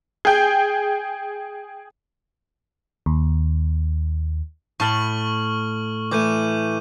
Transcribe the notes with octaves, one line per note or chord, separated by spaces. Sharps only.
G#4 G5
D#2
A2 A5 B5 C#6 F6 F#7
E3 A3 D6 G6 D#7